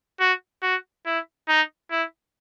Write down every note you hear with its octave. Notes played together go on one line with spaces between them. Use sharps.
F#4
F#4
E4
D#4
E4